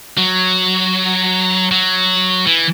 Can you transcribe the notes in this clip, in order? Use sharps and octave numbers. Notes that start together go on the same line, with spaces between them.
F#3
F#3
E3